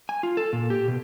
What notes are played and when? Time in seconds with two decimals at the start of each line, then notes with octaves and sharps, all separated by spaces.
0.09 G#5
0.23 F4
0.37 A4
0.53 A#2
0.70 G4
0.88 B2